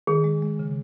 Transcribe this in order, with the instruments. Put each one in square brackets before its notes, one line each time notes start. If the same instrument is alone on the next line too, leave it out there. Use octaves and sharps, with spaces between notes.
[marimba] D#3 [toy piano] G#4
[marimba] G#3
G#3
C#3